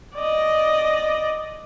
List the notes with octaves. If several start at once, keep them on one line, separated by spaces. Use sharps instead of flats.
D5 D#5